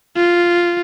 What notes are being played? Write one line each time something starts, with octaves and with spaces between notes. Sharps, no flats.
F4